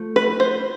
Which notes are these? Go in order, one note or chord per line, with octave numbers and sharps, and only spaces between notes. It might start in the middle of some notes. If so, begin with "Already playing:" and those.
Already playing: F3 A3
B4
C5